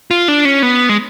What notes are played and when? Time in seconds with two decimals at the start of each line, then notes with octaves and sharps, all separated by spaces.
0.11 F4
0.28 D4
0.45 C#4
0.63 B3
0.89 G#3